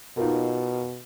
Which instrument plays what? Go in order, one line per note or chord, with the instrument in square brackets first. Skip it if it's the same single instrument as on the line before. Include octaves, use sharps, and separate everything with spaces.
[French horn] B2 [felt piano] D#4 F4 A#4